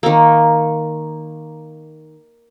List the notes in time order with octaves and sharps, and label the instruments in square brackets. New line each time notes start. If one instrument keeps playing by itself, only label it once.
[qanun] D#3 A#3